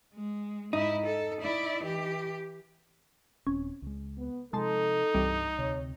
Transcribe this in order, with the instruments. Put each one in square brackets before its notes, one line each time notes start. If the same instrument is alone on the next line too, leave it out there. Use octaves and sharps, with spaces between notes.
[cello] G#3
[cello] G#2 E4 [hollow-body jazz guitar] D#4
[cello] A4
E4 D5
E3 G4
[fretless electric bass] D#1 C4 [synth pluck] C#4
[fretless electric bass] C#2 G#3
[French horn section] B3
[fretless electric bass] C3 F3 [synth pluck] G#3 A5 C6 [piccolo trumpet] D#4 [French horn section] A4
[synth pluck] C2 E3 G3 [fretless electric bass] G2
[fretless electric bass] D2 C3 [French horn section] C#5